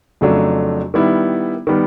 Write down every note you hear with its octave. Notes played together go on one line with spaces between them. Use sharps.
F2 C#3 F#3 A3 D4
D#3 G3 B3 E4
D#3 G3 B3